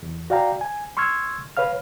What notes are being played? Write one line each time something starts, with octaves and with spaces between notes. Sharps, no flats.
E2
F#4 D5 F5 G5 A#5
G#5
C6 C#6 E6 F6 G#6
B4 C#5 F5 F6